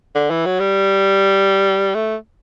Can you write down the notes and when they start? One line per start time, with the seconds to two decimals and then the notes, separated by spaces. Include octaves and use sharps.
0.15 D3
0.30 E3
0.46 F#3
0.60 G3
1.95 A3